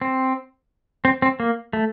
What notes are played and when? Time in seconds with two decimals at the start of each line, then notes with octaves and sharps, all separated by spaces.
0.01 C4
1.05 C4
1.22 C4
1.40 A#3
1.73 A3